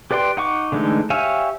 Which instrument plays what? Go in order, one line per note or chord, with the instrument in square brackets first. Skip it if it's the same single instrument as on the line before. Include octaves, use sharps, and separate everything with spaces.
[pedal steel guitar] G4 B4 D5 G5 C6
D#4 F#5 C#6 D6
D3 E3 G#3 A3 D#4
G4 C#5 E5 F5 G#5